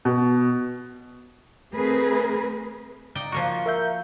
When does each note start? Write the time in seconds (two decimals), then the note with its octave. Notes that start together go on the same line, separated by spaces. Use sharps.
0.05 B2
1.73 A3 C4 G#4 A#4 B4
3.15 D#4 D5 G5
3.32 F3 A#3 F#4 C#6 C#7
3.66 A#4 E5 G6